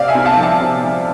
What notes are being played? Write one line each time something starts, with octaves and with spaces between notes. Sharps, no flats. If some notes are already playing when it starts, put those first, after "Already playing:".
Already playing: C3 D5 F5
E5 G#5
C3
F5 A5
F3
F5 A5
C3
F3